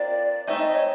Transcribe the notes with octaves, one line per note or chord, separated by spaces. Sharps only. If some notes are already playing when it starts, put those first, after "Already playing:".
Already playing: C4 F4 A#4 D5
A3 C4 D#4 G#4 E5
D#5
C#5